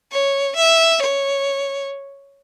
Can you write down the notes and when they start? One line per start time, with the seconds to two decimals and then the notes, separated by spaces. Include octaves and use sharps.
0.11 C#5
0.56 E5
1.02 C#5